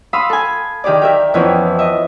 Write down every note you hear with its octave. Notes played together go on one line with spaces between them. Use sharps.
F5 B5 C6 D#6 E6
A4 G#5
D#3 G4 G#4 D5
G4 A#4 E5
F2 E3 B3 C#4 E4
D#5 E5